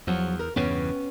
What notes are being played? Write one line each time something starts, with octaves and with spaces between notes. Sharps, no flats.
E2 F3 F#3 F#5
A#4
E2 G2 C#3 B3 C#4 G5